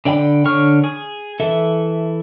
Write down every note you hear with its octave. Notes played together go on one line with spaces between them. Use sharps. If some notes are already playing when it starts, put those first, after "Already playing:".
D3 D5 G5 B5
D3 C#5 C#6 F6
G#4
E3 A4 E5